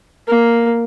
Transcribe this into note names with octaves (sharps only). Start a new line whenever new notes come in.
A#3